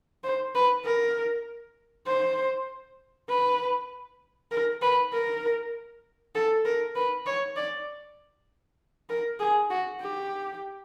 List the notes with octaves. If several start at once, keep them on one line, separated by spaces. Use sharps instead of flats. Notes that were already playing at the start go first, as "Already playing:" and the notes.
C5
B4
A#4
C5
B4
A#4
B4
A#4
A4
A#4
B4
C#5
D5
A#4
G#4
F#4
G4